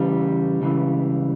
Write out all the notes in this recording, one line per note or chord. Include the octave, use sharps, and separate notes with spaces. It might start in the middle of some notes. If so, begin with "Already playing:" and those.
Already playing: E2 C#3 E3 G3
C#2 C#3 E3